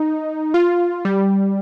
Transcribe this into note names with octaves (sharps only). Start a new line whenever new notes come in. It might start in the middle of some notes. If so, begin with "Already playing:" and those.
Already playing: D#4
F4
G3